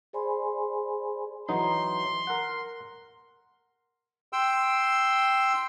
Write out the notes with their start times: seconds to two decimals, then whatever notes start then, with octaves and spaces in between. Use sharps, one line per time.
0.13 G#4 C5 D5 G#5 B5 C6
1.49 E3 F#3 D#4 C6
2.27 A#4 F#5
4.33 G5 C6 E6